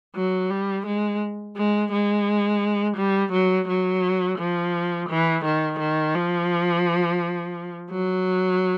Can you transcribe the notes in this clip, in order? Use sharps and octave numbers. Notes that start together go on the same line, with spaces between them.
F#3
G3
G#3
G#3
G#3
G3
F#3
F#3
F3
E3
D#3
D#3
F3
F#3